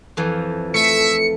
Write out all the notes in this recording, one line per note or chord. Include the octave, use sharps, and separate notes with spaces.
F2 E3 F3
A3 E5 C#7